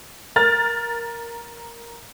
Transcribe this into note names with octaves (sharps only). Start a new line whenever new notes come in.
A#4 F6 A6